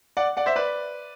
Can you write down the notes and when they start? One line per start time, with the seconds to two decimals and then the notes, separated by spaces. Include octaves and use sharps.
0.17 D5 F#5
0.37 D5 F#5
0.46 C5 E5
0.56 B4 D5